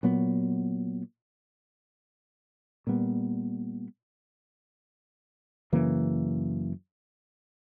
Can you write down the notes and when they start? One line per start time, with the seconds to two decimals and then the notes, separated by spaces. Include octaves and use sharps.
0.03 A#2 F#3 B3
2.87 A#2 G3 B3
5.73 F#2 C#3 E3 A#3